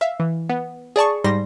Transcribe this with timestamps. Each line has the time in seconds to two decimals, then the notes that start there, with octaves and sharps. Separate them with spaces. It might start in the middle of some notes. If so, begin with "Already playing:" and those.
0.01 E5 F5
0.20 E3
0.49 B3
0.96 G#4 D5 A5 C#6
1.24 G#2 G3 C6 A#6